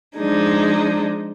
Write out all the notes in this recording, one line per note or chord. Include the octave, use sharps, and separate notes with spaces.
F3 G#3 D4 D#4